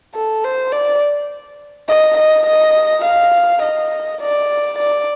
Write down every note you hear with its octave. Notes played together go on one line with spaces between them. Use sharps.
A4
C5
D5
D#5
D#5
D#5
F5
D#5
D5
D5